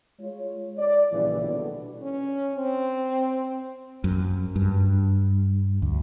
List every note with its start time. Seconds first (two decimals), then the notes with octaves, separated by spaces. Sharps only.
0.19 G#3 F4 C#5
0.78 D5
1.13 A#1 C#3 E3 G3
1.43 B2 D3
2.02 C#4
2.54 C4
4.04 F#2
4.56 G2
5.82 D2